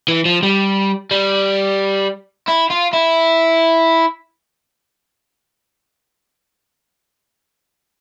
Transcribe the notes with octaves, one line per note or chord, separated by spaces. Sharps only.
E3
F3
G3
G3
E4
F4
E4